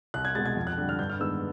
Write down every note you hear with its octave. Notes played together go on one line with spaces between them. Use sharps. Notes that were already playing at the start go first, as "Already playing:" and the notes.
C2 F#6
G#6
B2 G#3 A6
G#6
F2
F#6
D3 G3
F6
G2 G6
F6
D#3 G#3 B3 E6